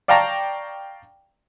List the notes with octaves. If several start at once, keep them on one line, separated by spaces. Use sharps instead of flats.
D5 F5 G5 A5 A#5 C#6